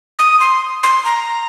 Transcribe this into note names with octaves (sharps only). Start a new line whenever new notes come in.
D#6
C6
C6
A#5